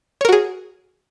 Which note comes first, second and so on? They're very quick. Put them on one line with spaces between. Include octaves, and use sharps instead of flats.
C#5 A#4 F#4 G#4